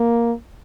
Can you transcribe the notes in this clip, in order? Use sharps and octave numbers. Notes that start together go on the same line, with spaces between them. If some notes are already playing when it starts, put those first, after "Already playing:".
Already playing: A#3